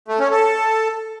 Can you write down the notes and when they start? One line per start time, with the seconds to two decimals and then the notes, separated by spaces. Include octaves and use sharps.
0.08 A3
0.20 C#4
0.31 A4